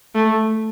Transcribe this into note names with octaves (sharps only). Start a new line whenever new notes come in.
A3